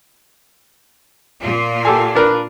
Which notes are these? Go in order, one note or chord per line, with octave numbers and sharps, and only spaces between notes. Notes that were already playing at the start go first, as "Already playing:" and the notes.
A#2 A#3 F4
G4 A4 G#5
D4 A#4 B4